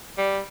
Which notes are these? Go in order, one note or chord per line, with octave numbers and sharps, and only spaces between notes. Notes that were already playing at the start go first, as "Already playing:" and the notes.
G3